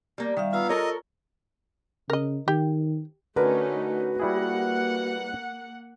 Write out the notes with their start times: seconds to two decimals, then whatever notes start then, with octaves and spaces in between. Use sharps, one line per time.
0.18 G3 A#3
0.37 D#3 G3 E5 F5
0.53 B3 F4 F5 A#5 E6
0.69 A4 A#4 C#5 D#5
2.10 C#3 A#4 D#5
2.48 D#3 G4
3.36 D3 A3 C#4 D#4 F#4 A#4 B4
4.20 G3 A#3 E4 G#4 F#5